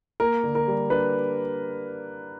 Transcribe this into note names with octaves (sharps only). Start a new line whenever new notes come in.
A#3 A#4
D3
A#4
G3
D4 B4